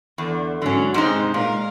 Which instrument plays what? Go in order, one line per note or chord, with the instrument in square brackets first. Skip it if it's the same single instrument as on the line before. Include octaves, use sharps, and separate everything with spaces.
[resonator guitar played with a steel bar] E2 [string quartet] D3
[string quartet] G#2 F#3 [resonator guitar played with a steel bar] D3 C#4
[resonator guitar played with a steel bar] G#2 C3 D#4 [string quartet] G#3 C5
[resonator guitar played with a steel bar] A#2 [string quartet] G#3 A#4 F5